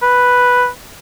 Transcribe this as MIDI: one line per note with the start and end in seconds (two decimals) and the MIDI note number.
0.02 0.68 71